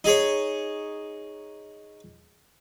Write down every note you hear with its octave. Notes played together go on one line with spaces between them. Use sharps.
D#4 G#4 C#5